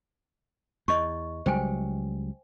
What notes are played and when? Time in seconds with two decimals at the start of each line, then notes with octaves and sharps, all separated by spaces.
0.88 E2 D#5 C#6
1.46 C#2 F#3 G3 C5 G5 G#5